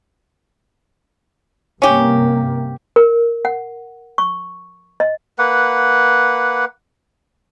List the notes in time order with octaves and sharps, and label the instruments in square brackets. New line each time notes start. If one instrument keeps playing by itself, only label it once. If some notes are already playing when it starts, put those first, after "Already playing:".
[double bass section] G2 C3 A#3 [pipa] C#4 G4
[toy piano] A#4
F#5
C#6
D#5
[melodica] A#3 B4 F#5